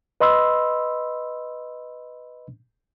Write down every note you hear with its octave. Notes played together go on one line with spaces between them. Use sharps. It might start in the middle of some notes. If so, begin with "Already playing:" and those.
B4 D#5 B5 C6 E6